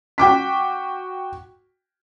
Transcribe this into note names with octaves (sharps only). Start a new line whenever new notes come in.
F#4 G5 D6 B6